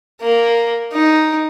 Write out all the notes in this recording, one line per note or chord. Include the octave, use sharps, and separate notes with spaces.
A#3
D#4